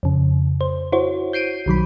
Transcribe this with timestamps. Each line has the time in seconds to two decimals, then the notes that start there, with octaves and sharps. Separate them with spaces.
0.03 F2 C#3
0.61 C5
0.92 E4 F#4 C5 C#5
1.33 G6 C7 D7 D#7
1.66 B1 D#3 F#3 B5